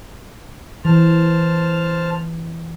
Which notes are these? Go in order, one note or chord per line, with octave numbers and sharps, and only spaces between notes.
E3 C5 A5 F6